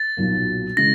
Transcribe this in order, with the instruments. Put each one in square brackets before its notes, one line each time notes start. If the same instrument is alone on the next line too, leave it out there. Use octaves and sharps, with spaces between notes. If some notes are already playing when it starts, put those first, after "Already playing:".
Already playing: [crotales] A6
[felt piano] B1 A#2 F#3 A#3
[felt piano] C#3 E3 G#3 [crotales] A#6